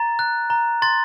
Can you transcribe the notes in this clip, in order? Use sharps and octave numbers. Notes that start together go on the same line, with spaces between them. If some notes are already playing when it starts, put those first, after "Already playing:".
Already playing: A#5 A6
F#6
A#5
C6 A6